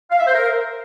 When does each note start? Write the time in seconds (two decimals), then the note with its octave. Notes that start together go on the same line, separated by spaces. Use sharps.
0.11 F5
0.19 E5
0.27 C5
0.34 A#4